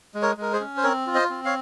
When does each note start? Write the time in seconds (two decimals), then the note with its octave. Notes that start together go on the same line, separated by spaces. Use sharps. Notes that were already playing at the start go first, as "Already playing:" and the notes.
0.14 G#3
0.22 A#4 C#5
0.37 G#3 A#4
0.53 G#4 C5
0.60 C#4
0.77 C5
0.83 C4 A#4 C#5
1.07 F4
1.14 C5 D#5
1.30 C4
1.45 C#5 F5